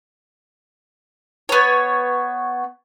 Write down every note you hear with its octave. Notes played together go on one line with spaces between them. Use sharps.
B3 C#5